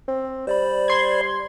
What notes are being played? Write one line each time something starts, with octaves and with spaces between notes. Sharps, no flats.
C4
G3 C5 D5 B5
C6 G#6